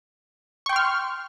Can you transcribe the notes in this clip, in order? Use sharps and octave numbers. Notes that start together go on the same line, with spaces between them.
G5 C6 C#6 F6